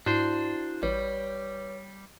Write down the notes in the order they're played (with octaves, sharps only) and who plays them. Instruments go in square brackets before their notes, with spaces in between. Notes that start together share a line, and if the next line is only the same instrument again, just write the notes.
[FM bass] G#2 [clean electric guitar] D4 C5 [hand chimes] E4 F#4
[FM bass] A1 [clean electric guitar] G3 [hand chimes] B4 C#5